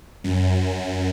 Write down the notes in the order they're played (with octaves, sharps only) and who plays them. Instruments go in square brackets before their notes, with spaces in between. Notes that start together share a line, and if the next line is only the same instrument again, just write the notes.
[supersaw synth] F#2